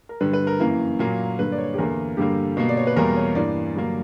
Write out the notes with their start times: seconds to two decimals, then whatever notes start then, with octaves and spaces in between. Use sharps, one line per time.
0.09 A#4
0.20 G2 D3 G3 B4
0.33 B4
0.47 A#4
0.60 F#2 E3 A#3
0.99 A#2 F#3 A#3
1.39 G2 D3 A#3 B4
1.52 D5
1.58 C#5
1.74 G4
1.78 E2 D3 A#3 A#4
2.17 G2 D3 G3 A#3 G4
2.57 B2 A#3
2.69 D5
2.77 C#5
2.87 B4
2.96 E2 B2 G3 A#3 A#4
3.16 C#5
3.35 G2 E3 A#3 D5
3.75 G2 D3 F#3 A#3